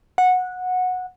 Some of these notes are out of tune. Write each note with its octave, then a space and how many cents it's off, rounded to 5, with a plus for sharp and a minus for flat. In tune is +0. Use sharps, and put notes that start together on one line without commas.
F#5 -15